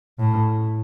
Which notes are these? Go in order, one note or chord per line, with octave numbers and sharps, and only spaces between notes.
A2